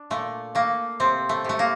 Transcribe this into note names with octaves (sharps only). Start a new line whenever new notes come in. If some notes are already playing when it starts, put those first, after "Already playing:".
Already playing: D4
A#2 A3
A3 A#3
C3 C4
A3
C3 A3
A#3